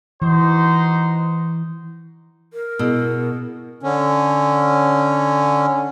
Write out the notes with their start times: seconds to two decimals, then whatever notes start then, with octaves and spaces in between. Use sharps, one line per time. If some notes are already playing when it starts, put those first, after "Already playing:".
0.22 E3 D#4 F#4 C5
2.53 A#4
2.79 B2 B3 E4 G#4
3.83 D3 C#4